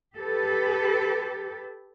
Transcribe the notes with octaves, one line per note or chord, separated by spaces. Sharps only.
G4 A4 B4